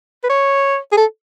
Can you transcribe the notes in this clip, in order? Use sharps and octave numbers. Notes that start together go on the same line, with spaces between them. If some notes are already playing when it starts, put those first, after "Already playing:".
B4
C#5
G#4
A4